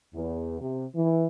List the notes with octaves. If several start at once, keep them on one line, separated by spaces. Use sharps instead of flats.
E2
C3
E3